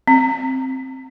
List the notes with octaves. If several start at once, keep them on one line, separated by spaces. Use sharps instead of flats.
C4